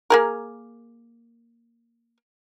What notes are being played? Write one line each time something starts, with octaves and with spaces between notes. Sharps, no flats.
A#3 G#4 A#4